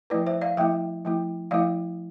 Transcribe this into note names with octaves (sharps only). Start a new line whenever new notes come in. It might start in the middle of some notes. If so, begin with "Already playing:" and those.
F3 A3 E4 B4 D5
C5 E5
D5 F5
F3 A3 E4 E5 G5
F3 A3 E4
F3 A3 E4 D5 F5